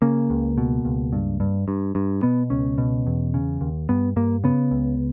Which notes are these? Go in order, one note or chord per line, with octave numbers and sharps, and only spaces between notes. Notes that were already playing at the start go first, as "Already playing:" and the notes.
C#3 A#3
C#2
B2
C#2
G2
G2
G2
G2
B2 B3
C#2 C#4
B2
E2
C#3
D#2
G2 B3
G2 A#3
C#3 B3
C#2